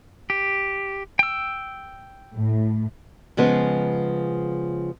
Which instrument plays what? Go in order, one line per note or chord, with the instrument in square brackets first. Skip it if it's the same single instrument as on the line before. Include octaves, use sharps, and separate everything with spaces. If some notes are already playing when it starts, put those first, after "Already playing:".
[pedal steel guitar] G4
G5 E6
[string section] A2
[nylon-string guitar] C#3 F3 G#3 B3